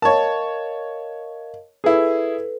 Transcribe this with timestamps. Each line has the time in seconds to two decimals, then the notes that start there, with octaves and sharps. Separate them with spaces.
0.02 A#4 C#5 D#5 F5 A5
1.84 E4 G#4 A4 B4